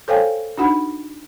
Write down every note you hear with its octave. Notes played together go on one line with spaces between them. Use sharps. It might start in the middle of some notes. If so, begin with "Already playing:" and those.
A4 C5 C#5 F5 G5 G#5
D4 D#4 F#4 F#5 B5